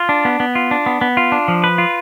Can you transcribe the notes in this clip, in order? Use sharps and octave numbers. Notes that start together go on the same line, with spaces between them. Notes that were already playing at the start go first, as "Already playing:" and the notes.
Already playing: F4
D4
B3
B3
F4
D4
B3
B3
F4
D4
F3
B4
F4